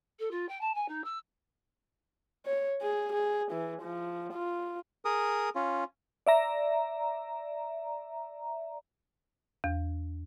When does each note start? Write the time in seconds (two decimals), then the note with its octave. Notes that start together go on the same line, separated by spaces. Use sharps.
0.19 A4
0.31 F4
0.48 G5
0.60 A5
0.74 G#5
0.88 D#4
1.04 E6
2.46 C#5
2.82 G#4
3.13 G#4
3.52 E3
3.82 F3
4.33 F4
5.05 G#4 A#4 D#6
5.55 C#4 F4
6.27 D5 E5 A#5
9.64 E2